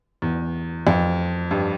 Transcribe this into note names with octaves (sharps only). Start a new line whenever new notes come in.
E2
F2
G2